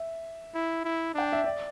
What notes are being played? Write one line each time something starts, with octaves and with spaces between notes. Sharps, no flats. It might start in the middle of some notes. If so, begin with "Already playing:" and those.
Already playing: E5
E4
E4
D4 G5
E5
D5